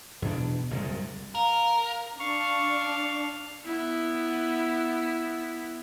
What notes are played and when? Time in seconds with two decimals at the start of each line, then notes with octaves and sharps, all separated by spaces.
0.22 E2 B2 D4
0.70 F#1 C2 G2 G#3
1.35 A#4 F5
2.20 D4 F5 C#6
3.65 B3 E4